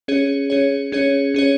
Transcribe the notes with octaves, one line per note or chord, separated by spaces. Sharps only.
C#4 G#4 C#5
C#4 G#4 C#5
C#4 G#4 C#5
C#4 G#4 C#5